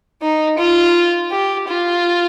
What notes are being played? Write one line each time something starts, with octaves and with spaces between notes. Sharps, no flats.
D#4
F4
G4
F4